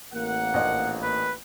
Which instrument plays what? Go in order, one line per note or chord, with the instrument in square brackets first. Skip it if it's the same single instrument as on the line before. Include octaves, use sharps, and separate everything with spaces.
[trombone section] A1 A#3 [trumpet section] F#5
[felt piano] A#1 D#5
[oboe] B4